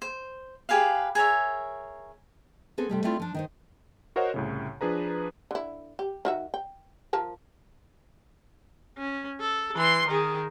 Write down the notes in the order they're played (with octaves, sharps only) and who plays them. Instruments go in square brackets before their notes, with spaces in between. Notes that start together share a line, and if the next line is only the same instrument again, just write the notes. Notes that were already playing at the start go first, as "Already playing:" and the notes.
[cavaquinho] C5
G4 G#4 B4 F5
G#4 A#4 C#5 E5
[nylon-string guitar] B3 C4 G#4 A4
C3 G3 A3
A3 C4 E4 F4 A4 D5
F3 D4
D#3 D#4 C5
[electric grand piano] F#4 A#4 C5 C#5 D#5 F#5
C2 A2 C#3
F3 D4 G#4 B4 A#5
[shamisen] D3 E4
G4
D#3 F#4 E5
G5
F3 A#4 A5
[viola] C#4
A4
E3 C6
D#3 G#4